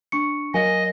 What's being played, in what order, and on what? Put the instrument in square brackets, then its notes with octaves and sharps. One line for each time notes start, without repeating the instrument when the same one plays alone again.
[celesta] D4 C#6 C#7
[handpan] F#3 A#4 F5 [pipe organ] D#5 [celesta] G#5